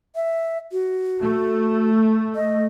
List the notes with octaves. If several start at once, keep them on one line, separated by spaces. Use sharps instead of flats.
E5
F#4
A3
D#5